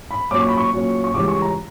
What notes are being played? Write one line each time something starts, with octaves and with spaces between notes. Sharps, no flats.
B5
A#2 F#3 C#4 D6
C#6
B5
C#6
A#2 F#3 C#4
C#6
C#2 C#3 E3 G3 C#4 D6
C#6
A#5